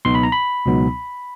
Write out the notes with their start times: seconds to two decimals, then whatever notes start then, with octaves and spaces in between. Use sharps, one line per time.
0.05 C#2 B2 F#3 B3 D#4 C6
0.15 B5
0.23 A#5
0.32 B5
0.66 C#2 B2 F#3 B3 D#4